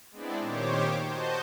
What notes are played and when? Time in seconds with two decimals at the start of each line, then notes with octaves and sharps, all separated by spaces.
0.12 G#3 B3 C4 D4 E4 D5
0.40 A#2 D#3 G4 C5 C#5 D6
1.05 F#4 C5 D#5 A5 G6